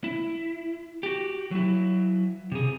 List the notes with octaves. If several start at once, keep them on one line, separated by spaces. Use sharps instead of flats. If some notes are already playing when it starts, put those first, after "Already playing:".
E4
F#4 G4
F#3 E4
C3 G#4